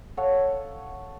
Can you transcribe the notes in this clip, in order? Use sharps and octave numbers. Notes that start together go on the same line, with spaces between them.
A4 C#5 F5 F#5